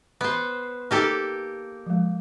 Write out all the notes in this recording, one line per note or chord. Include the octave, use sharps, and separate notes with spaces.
B3 C5
A#3 D#4 G4 A4
F3 G#3